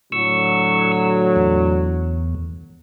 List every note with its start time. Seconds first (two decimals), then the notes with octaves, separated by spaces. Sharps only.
0.12 A2 D3 F#3 C#6 E6
1.36 E2